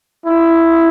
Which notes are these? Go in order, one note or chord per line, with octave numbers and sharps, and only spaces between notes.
E4